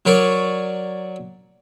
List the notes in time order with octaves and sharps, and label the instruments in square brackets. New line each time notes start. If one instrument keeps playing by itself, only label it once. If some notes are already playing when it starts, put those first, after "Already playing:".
[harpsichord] F#3 A#4 C#5 D5